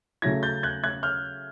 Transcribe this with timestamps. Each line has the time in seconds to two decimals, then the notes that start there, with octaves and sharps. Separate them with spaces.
0.22 C#3 F#3 A3 C#4 E4 G#6 A#6
0.43 G6 A6
0.63 F#6 G#6
0.84 F#6 G#6
1.03 F6 G6